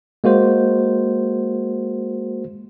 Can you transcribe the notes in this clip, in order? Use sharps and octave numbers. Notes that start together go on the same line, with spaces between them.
G#3 A#3 F#4 C5